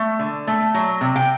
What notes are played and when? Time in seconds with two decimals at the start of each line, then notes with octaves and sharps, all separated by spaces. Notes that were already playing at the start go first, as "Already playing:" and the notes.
Already playing: A3
0.19 D3
0.47 A3
0.74 F#3
1.01 C3
1.16 G5